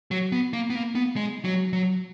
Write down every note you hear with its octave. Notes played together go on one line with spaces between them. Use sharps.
F#3
B3
A#3
B3
A#3
B3
G#3
F#3
F#3